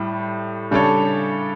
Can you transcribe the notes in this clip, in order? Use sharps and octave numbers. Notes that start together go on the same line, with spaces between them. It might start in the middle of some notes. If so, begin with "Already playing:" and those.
Already playing: A2 G3
C#3 G3 D4 A4 C#5